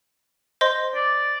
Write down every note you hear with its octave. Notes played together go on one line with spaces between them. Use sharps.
C5 D#5 C6
D5